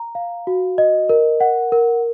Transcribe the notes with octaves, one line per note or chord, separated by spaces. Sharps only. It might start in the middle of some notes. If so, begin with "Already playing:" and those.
Already playing: A#5
F5
F#4
D#5
A#4
F#5
A#4